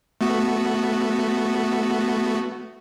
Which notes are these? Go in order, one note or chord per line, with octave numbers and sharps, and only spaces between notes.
A3 B3 F#4